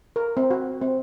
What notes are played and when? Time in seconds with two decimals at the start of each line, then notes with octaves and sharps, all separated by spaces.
0.16 A#4
0.37 C4
0.51 F#4
0.81 C4